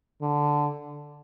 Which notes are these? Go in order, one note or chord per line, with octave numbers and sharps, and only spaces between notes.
D3